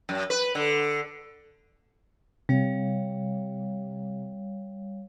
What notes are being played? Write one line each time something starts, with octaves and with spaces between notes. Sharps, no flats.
F#2
B4
D3
C3 G3 C#5 F5